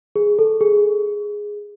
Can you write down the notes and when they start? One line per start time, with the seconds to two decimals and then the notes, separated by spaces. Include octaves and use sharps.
0.16 G#4
0.39 A4
0.61 G#4